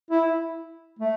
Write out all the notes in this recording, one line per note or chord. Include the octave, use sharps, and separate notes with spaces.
E4
A3